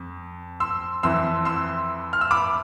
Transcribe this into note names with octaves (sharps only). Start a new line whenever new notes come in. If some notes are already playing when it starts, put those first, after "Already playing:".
Already playing: F2
C6 E6
F2 E3 C6 E6
C6 E6
F6
E6
B5 D6